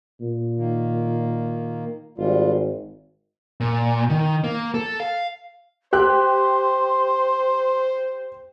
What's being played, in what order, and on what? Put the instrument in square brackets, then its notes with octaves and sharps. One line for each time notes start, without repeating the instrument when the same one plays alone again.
[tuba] A#2
[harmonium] D#3 A#3
[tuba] G#1 [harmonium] G3 G#3 F4
[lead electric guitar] A#2
D#3
A#3
A4
F5
[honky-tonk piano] G4 F#6 [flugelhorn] C5 [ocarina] C6